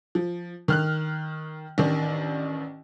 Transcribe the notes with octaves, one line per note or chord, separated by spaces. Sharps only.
F3
D#3 F6 F#6
A1 D#3 D4